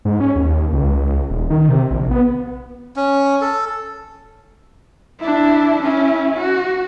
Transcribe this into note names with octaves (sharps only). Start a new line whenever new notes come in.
G#2
C#4
D#2
C#2
D#1
D#3
C3
A#1
B3
C#4
A4
D4 E4
C#4 E4
F#4